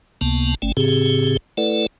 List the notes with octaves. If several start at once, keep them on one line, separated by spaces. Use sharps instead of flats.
C#2 C3 A#3 B3 A5
G1 A3 C#4
A2 C#3 C4 G4 G#4
A3 E4 A4 B4 D5 F#5